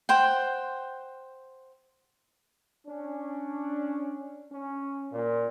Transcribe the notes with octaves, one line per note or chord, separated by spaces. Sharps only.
C5 F#5 G5
C#4 D4
C#4
A#2